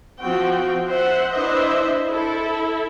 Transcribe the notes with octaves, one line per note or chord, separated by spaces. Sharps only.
F3 C4 F#4 G5
C5 E5 F#5
D4 E4 B4 C5 D#5 E5
E4 A4